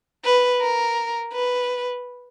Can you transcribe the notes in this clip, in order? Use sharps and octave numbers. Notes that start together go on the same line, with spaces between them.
B4
A#4
B4